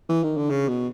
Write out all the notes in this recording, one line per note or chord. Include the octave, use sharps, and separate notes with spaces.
E3
D#3
D3
C#3
B2